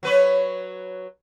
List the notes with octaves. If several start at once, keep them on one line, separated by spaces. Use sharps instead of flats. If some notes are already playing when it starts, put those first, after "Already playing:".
F#3 B4 C#5